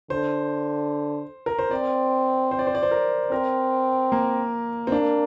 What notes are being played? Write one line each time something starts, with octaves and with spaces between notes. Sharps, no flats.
D3 C5
A#4
C5
C4 D5
C5
D5
C5
D5
C5
A#4
C4 A#4
A#3
C4
A#3 D4